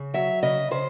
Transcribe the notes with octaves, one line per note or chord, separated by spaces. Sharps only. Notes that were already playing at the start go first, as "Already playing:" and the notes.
Already playing: C#3
F#3 E5
C#3 D#5
C#3 C5